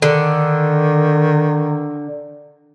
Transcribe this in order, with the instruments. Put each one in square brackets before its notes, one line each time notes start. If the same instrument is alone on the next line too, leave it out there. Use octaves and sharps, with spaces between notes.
[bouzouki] D3 [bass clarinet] D#3